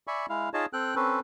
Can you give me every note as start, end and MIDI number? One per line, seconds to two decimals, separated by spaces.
0.07 0.26 74
0.07 0.26 76
0.07 0.26 80
0.07 0.26 83
0.07 0.26 85
0.29 0.49 56
0.29 0.49 64
0.29 0.49 77
0.54 0.66 63
0.54 0.66 65
0.54 0.66 68
0.54 0.66 73
0.54 0.66 75
0.54 0.66 81
0.73 0.95 60
0.73 0.95 69
0.73 0.95 79
0.73 0.95 90
0.95 1.20 60
0.95 1.20 61
0.95 1.20 69
0.95 1.20 71